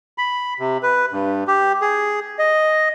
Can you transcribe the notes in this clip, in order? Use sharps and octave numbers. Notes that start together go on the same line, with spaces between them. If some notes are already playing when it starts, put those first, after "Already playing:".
B5
C3
B4
G2
G4
G#4
D#5